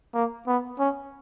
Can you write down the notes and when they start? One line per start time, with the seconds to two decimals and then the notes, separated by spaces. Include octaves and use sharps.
0.14 A#3
0.47 B3
0.79 C#4